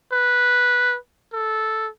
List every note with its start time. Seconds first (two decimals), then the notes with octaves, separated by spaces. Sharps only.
0.12 B4
1.33 A4